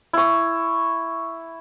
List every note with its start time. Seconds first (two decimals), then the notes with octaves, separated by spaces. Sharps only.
0.13 E4 C#6